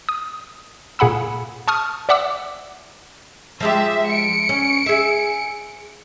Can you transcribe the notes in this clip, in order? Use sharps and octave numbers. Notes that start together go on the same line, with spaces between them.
D#6
A#2 G#4 F#5 B5 E6
A5 C#6 D#6 F6
D5 E5 F#5 D6 E6
F3 G#3 G4 E5
C#7 D7
C#4
G#4 E5